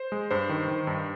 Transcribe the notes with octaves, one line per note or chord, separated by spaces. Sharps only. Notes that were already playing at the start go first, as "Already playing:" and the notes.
Already playing: C5
G#3
G2 C5
D#3
D#3
G2